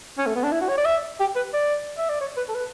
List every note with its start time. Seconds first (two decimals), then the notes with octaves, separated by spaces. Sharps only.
0.18 C#4
0.27 A3
0.36 B3
0.44 D4
0.52 E4
0.61 F#4
0.69 C#5
0.78 D5
0.85 E5
1.20 G4
1.36 B4
1.54 D5
1.98 E5
2.09 D5
2.21 C#5
2.37 B4
2.49 A4
2.55 B4